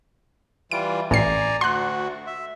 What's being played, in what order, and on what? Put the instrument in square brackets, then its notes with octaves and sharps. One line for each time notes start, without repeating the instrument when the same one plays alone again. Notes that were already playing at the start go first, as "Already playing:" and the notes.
[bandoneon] E3 G3 F4 [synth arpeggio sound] D7
[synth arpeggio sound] A1 C7 [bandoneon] D5 G#5 A#5
[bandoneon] D2 F#4 [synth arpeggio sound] C6 F#6
[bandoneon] E5